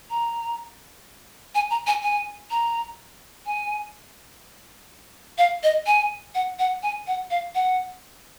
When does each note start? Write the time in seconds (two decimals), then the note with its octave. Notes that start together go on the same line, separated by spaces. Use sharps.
0.10 A#5
1.55 G#5
1.71 A#5
1.87 G#5
2.03 G#5
2.51 A#5
3.46 G#5
5.38 F5
5.63 D#5
5.87 G#5
6.35 F#5
6.59 F#5
6.83 G#5
7.07 F#5
7.30 F5
7.55 F#5